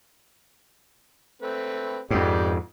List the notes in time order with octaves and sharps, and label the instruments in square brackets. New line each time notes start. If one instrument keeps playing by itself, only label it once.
[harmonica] A3 C4 B4
[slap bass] F2 G#2 [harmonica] G4 B4 D5